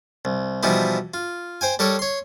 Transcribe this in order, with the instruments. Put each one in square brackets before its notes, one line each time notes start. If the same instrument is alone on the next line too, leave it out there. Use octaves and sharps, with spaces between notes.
[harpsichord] C2
B2 E3 F3 G3 D#4 E4
F4
C5 G5 G#5
G3 A4 A#4 C#5
C#5 C6